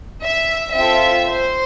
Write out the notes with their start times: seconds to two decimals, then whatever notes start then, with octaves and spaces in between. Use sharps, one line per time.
0.24 E5
0.75 C4 F4 A4 E5
1.27 C5